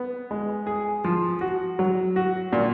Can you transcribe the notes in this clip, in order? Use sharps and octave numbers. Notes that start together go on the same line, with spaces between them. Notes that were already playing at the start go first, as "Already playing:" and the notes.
Already playing: B3
G#3
G#4
F3
F#4
F#3
F#4
A#2